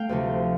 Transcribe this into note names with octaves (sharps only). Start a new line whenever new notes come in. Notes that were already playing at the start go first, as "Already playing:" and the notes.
Already playing: A3 F5 G5
D2 C3 F3